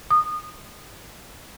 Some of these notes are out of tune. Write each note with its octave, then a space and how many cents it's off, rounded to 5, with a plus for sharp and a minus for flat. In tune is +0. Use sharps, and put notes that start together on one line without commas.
D#6 -20